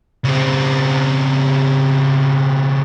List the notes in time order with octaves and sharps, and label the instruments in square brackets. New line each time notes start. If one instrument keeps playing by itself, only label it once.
[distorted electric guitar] C#3 C4